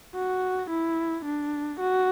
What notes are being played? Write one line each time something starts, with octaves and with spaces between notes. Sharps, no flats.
F#4
E4
D4
F#4